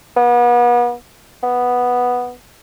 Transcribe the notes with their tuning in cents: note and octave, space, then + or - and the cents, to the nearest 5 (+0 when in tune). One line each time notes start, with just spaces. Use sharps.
B3 -35
B3 -5